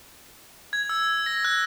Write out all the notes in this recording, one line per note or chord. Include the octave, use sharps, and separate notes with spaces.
G#6
E6
A#6
F#6